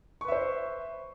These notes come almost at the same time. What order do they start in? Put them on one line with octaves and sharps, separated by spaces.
C#6 B4 E5 C5